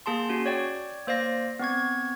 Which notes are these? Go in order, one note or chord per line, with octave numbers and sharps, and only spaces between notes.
A#3 G#4 A5 C6
C#4 F#4
C#5 D5 G5
A#3 C5 D5 F5 A#6
B3 C4 C#6 G#6